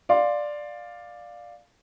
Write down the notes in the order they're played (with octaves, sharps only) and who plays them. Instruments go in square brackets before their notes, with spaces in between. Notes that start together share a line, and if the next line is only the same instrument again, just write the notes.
[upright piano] D5 F5 C6